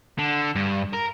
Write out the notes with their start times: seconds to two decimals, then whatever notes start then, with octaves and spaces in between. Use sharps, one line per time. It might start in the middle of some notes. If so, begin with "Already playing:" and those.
0.19 D3
0.55 G2
0.93 A#4